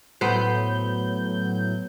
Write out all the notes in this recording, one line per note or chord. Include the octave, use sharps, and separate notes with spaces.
A2 F#3 B3 C5 G6